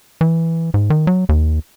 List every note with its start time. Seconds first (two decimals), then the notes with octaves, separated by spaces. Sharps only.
0.21 E3
0.74 G#2
0.90 D#3
1.07 F#3
1.29 D#2